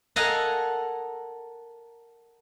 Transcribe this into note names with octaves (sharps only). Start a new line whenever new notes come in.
A4 A#4 D#5 F5 F#5 G#5